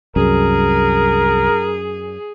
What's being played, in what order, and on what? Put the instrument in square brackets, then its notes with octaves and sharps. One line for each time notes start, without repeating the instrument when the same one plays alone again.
[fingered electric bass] C2 [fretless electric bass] F#2 [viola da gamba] G#4 [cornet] A#4